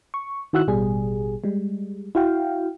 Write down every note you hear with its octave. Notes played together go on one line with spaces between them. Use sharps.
C#6
D#3 E4 F#4 E6 F#6
A1 B2 G3 G#4
G3 G#3
E4 F#4 F5 G5